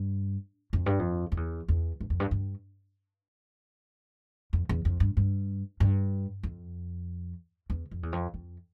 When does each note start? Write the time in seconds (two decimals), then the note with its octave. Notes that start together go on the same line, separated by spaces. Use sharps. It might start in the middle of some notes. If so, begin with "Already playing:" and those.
Already playing: G2
0.73 F2
0.86 G2
0.99 F2
1.32 F2
1.37 E2
1.68 E2
2.01 G2
2.10 F2
2.20 G2
2.31 G2
4.53 F2
4.69 E2
4.85 F2
5.00 G2
5.17 G2
5.80 G2
6.43 F2
7.70 E2
7.91 F2
8.03 E2
8.12 F2
8.34 F2